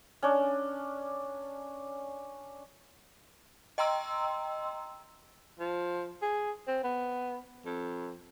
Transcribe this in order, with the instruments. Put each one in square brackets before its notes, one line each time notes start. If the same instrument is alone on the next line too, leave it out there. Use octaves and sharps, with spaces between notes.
[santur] C#4 D4
[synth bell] D#5 G5 A#5 C6 E6
[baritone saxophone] F3
G#4
C4
B3
F2